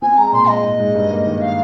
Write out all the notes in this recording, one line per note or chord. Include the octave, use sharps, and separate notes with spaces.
C4 G#5
G#3 A#5
A#2 C6
G#3 D#5
G#2
G#2
G2
A#3
D#3
F5